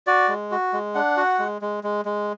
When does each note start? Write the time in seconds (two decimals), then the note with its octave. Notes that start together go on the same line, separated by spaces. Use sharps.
0.07 F#4 D5
0.29 G#3
0.51 F#4
0.73 G#3
0.95 D4 F#5
1.17 F#4
1.39 G#3
1.62 G#3
1.84 G#3
2.05 G#3